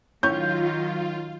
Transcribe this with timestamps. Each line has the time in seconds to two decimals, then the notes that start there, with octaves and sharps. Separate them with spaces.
0.23 A2 D#3 F#3 C#4 F4 C#5 G6